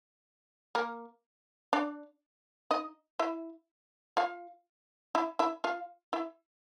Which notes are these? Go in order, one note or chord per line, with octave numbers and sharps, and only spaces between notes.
A#3 A#4
D4 D5
D#4 D#5
E4 E5
F4 F5
E4 E5
E4 E5
F4 F5
E4 E5